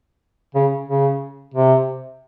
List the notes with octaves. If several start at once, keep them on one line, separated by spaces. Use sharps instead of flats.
C#3
C#3
C3